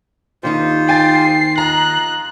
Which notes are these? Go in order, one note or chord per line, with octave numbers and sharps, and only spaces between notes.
D#2 D#3 D#4 F4 G4 C5
G5 G#5 A6 C7
F4 D#5 A#5 F#6